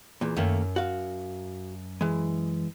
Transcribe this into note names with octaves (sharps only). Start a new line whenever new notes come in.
E2 A#2
F#2 D#3 A3 A#3
F#4 F5
E3 G#3